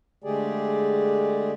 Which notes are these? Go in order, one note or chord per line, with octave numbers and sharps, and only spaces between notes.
D3 G#3 A3 G4 G#4 D5